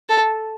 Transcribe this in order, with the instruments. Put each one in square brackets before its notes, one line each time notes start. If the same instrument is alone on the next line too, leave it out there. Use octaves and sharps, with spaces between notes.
[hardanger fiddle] A4